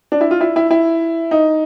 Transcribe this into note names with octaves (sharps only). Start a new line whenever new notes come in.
D4
E4
F4
E4
E4
E4
D#4